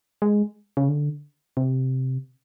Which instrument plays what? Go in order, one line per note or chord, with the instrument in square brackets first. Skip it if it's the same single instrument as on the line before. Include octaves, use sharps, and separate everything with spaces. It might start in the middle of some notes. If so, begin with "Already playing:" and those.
[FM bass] G#3
C#3
D3
C3